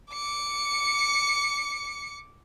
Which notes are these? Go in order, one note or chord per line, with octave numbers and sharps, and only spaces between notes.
D6 C#7